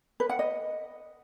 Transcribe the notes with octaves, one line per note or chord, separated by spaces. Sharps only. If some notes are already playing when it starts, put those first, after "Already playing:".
B4
F#5
D#5